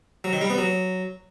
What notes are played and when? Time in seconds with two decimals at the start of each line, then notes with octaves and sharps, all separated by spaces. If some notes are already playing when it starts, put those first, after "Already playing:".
0.24 F#3
0.33 D#3
0.41 G3
0.50 B3
0.58 F#3